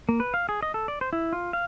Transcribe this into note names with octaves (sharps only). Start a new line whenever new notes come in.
A#3
B4
F5
G#4
D#5
A4
D5
C5
E4
F4
F5